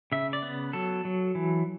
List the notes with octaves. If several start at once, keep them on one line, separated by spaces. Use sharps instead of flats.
C#3 E5
D5
B3
F#3 A4
F#3
E3